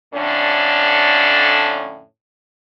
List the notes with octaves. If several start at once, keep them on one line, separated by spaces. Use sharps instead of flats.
F2 A2 D3 C#4 D4